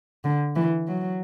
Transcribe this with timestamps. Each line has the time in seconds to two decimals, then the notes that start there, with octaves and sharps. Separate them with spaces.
0.24 D3
0.56 E3
0.88 F#3